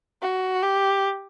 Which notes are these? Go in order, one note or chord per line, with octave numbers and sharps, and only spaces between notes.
F#4
G4